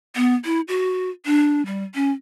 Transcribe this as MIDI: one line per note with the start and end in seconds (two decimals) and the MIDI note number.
0.16 0.35 59
0.45 0.61 64
0.68 1.10 66
1.26 1.64 62
1.66 1.83 55
1.95 2.11 61